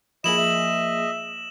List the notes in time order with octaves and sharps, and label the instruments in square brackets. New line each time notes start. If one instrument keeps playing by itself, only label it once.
[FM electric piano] F3 A#3 G#4 [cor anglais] E4 [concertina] D#5 [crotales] E7 F#7
[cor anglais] E5